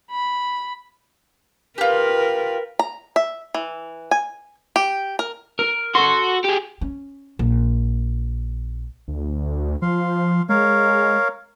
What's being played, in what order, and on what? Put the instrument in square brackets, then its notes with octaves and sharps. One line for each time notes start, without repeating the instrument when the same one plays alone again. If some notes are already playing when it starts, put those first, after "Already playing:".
[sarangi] B5
[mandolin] F4 G4 [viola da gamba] A#4 B4
[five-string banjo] A#5
E5
E3
G#5
G4
A#4
[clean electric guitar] A#4
[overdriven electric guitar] F#4 [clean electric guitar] A4 C6
[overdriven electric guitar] G4 G#4
[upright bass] C#4
A#1
[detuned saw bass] D2
[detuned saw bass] F3 [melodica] F5 C6
[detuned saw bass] G#3 [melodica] A#4 C#5 F5